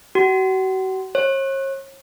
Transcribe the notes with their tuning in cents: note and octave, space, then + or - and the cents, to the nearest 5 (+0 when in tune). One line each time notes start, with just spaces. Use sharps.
F#4 +35
C#5 -40